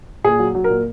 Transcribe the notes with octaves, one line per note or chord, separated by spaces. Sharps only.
A#2 G#4
F#3
F#3
A#4
A#2